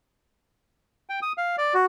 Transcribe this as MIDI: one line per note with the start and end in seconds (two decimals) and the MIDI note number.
1.09 1.20 79
1.22 1.32 87
1.38 1.56 77
1.58 1.74 74
1.74 1.86 66